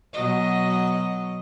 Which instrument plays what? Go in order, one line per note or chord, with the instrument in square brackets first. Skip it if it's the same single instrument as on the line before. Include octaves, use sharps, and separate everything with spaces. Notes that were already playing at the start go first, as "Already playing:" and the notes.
[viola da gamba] B2 F#3 D#5